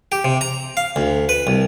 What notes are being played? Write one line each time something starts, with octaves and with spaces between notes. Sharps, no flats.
G4
C3
A#5
F5
D2
B4
C2